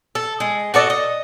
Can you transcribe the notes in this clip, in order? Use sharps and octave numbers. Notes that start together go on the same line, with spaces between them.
A4
G#3
F#4 A4 D5 D#5
D#5